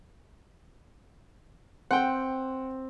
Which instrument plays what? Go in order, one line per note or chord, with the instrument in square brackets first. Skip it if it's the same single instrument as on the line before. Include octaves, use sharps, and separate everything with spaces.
[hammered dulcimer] C4 [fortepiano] F#5 G5